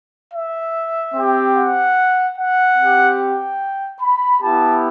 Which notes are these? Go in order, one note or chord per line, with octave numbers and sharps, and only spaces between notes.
E5
C4 G4
F#5
F#5
C4 G4
G5
B5
B3 E4 G4 A5